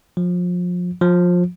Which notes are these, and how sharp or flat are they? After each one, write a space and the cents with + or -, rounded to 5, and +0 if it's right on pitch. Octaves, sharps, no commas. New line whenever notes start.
F3 +30
F3 +25